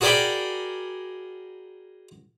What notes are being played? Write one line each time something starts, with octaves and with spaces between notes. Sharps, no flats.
F#4 G#4 A#4 D5 G5 B5